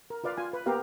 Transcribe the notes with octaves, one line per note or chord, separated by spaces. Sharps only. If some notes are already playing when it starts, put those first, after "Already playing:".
A#4
F4 B4 D5 F5
F4 G#5
B4
A#3 B3 G4 A#4 F5